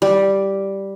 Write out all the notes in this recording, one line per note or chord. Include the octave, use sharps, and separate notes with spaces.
G3